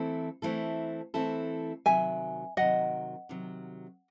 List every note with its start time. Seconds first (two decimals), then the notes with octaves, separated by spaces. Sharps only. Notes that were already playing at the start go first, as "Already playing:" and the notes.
Already playing: E3 A3 C4 E4 A4
0.42 E3 A3 C4 E4 A4
1.14 E3 A3 C4 E4 A4
1.86 C3 D#3 F#3 E5 G#5
2.57 C3 D#3 F#3 D#5 F#5
3.29 C3 D#3 F#3